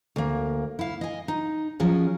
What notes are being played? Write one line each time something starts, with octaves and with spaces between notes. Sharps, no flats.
D2 A#3
E4 F5
D#5 G#5
D#4
F3 F#3 C#4 G#4